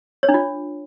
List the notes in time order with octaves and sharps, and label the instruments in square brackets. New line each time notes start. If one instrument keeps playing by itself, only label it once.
[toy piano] C#5
D4
F4